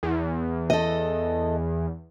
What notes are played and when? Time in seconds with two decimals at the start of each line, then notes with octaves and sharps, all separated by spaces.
0.03 E2
0.70 A4 D#5